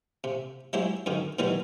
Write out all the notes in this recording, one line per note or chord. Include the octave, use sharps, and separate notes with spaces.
C3
F#3 G#3 E4 G4 C5
F#2 D3 D#3
B2 D#3 E3 F#3 G3